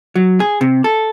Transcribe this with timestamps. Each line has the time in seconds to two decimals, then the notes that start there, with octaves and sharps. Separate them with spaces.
0.16 F#3
0.40 G#4
0.61 C3
0.84 A4